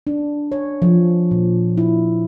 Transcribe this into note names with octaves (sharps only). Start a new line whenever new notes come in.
D4
C#5
F3
A#2
E4